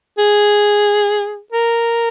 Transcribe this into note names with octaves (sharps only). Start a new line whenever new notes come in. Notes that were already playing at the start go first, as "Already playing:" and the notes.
G#4
A#4